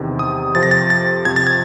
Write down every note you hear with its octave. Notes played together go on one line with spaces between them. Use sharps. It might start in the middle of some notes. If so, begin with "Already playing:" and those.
Already playing: E2 C3 D#3
D#6
F2 C3 F3 A6
A#6
A6
A6
F2 C3 F3 G#6
A6
G#6